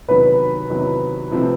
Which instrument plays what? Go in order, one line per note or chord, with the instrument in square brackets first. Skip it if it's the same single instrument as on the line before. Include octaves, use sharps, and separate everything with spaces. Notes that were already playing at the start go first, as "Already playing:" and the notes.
[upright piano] E2 C3 D#3 F#3 [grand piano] B4
[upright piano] E2 C3 D#3 F#3
C3 F3 A3 C4